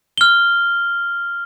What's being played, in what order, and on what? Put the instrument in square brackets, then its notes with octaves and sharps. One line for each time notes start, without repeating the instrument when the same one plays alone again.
[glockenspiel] F6 G7